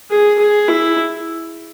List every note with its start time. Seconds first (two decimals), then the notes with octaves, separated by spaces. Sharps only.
0.11 G#4
0.39 G#4
0.68 E4